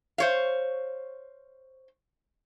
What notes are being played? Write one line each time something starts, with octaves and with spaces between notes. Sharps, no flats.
C5 C#5 F5